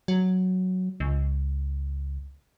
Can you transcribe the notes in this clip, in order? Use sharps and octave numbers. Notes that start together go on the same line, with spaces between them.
F#3
C#2